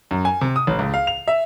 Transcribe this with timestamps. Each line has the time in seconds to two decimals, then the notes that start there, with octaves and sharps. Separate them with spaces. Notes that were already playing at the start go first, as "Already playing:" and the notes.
0.11 F#2
0.25 G#5
0.41 C3
0.56 D#6
0.67 A1
0.79 C#2
0.94 F5
1.07 F7
1.28 E5